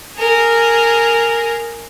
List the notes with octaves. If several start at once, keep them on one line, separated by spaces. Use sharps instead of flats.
G#4 A#4